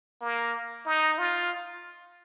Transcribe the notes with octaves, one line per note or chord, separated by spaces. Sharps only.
A#3
D#4
F4